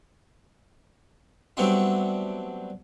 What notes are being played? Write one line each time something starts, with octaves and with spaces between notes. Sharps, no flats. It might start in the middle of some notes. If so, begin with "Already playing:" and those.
F#3 G3 A3 B3 C4 D4